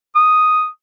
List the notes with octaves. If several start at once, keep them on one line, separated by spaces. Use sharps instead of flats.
D#6